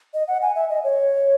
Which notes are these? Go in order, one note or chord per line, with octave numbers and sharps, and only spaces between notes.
D#5
F#5
G#5
E5
D#5
C#5